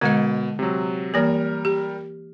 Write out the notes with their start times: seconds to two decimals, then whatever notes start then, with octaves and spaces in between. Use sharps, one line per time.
0.01 B2 D3 G#3 D#5
0.59 C3 F#3
1.14 E3 G3 A#3 A#4
1.65 G4